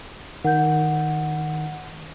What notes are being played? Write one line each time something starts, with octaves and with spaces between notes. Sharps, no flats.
D#3 F#5 G6